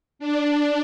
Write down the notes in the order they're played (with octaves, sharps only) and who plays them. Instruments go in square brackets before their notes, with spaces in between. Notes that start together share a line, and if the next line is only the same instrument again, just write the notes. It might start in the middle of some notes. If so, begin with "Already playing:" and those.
[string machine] D4